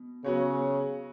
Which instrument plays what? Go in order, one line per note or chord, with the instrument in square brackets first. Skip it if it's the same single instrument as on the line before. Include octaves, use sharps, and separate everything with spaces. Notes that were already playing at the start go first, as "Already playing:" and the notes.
Already playing: [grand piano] B2
[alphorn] C#3 [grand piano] F#3 B3 F#4 C#5